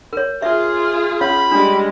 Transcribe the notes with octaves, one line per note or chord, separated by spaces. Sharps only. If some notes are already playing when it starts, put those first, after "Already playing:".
A#4 C#5
F4 G#4 E5
C#4 C#5 F5 B5
G3 G#3 D4